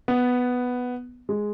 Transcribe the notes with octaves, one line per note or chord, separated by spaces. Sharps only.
B3
G#3